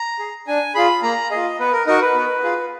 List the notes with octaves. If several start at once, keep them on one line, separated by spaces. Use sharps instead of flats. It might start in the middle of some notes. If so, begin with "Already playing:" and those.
Already playing: A#5
G#4
D4 G#5
F4 G#4 B5
A#3 A#5
G#4 D#5
F4
B3 B4
A#4
D#4 F#4 A#4
B4
B3
F4 G#4